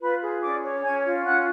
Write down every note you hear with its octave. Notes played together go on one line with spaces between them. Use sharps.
F4 B4 B5
G#4
C#4 D5 D6
C#5
C#4 G#5 G#6
F4
C#4 F#5 F#6